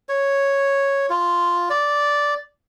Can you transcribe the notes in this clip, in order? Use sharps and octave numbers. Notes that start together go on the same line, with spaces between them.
C#5
F4
D5